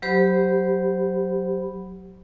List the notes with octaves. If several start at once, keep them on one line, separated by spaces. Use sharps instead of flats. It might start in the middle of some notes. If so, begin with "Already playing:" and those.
F#3 G4 C5 B5